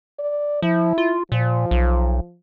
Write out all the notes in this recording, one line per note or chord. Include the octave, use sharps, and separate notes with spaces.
D5
F3 E4
F4
A#2 F3
B1